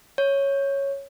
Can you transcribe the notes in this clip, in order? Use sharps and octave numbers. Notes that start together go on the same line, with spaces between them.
C#5